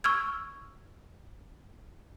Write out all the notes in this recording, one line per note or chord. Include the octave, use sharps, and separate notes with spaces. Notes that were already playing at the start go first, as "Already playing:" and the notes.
C#6 E6 F6 G#6